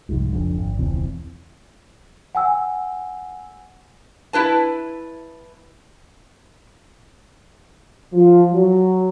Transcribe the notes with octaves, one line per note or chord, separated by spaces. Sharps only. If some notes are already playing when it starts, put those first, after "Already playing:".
C2 F2 G#2
F#1 F2 D3
G#1
E1 C#2 E3 C4
F#5 G#5 E6
E4 B4 A5
F3
F#3